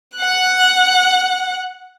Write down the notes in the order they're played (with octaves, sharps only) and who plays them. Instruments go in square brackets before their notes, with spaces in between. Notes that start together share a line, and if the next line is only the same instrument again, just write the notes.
[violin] F#5 F#6